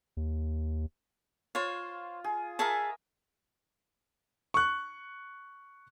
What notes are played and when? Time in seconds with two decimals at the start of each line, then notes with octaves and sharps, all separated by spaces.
0.17 D#2
1.55 F4 C5 C#5
2.24 G#4
2.59 G#4 A#4 E5 G#5 A5 C#6
4.54 C#6 F#6